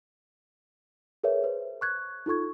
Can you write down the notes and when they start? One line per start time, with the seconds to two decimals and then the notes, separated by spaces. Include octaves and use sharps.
1.24 G#4 A#4 B4 C#5 E5
1.44 B4 C5
1.81 C#6 F#6 G#6
2.26 D#4 F4 A4 C#6 G#6